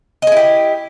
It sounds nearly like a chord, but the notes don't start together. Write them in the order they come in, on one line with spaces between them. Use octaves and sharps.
D#5 G#4 E4 G4